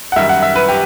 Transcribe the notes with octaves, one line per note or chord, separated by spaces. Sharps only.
F#5
F#2 D#3 G3 E5
F#5
E5
B4
G4